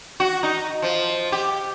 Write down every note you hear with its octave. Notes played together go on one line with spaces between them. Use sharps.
F#4
D#4
F3
G4